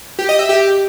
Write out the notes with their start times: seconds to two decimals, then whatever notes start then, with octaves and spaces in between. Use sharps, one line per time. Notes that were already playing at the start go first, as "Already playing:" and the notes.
0.19 G4
0.29 D#5
0.39 E5
0.49 G4